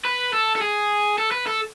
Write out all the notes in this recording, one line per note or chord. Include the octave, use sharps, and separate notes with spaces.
B4
A4
A4
G#4
A4
B4
A4